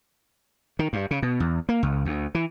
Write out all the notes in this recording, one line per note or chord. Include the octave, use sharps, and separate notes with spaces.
D#3
G2
C#3
B2
E2
A#3
C#2
D2
E3